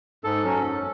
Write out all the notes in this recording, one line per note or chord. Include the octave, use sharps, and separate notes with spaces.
G#2 A4
F#3 C#4
F#2